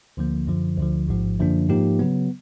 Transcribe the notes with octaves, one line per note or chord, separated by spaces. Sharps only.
D2 D3 F3 A#3
F#2 D3 F3
D2 D3 F3
A1 G#2 F3
F#2 D3 F3 A#3 D4
G#2 F3 A#3 D#4 G4
C#3 F#3 B3